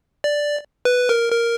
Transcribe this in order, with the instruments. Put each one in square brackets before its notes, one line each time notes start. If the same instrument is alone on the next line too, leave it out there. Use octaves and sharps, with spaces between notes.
[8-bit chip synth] D5
B4
A#4
A#4